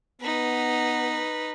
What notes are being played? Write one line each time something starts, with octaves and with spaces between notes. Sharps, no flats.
B3 D#4 B4